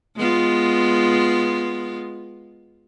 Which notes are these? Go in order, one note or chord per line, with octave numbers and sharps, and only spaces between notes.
G#3 B3 F4